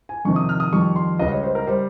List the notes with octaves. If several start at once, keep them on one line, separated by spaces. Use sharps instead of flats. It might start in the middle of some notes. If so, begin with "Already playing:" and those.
G#5
F2 C3 D#3 C#6
D#6
F6
D#6
F2 D#3 G3 C#6
C6
C#2 C#3 G3 D#5
C#5
C5
A#4
G3 C5